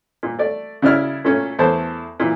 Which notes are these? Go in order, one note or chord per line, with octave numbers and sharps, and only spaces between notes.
A#2
A3 D5
C#3 E4 D5 F6
A#2 A3 C#4
E2 A3 C5 A5
A#2 E3